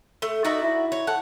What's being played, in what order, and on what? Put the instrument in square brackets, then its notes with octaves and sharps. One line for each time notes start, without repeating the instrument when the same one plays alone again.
[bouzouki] A3
[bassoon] D#4 [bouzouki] F#4 D5 E5
[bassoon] E4
[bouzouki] C#5
[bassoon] A4 [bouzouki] F#5